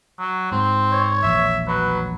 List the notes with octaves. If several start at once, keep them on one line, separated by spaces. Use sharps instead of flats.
F#3
G#2 C4
C#5
E1 A#1 E5
F#3 B4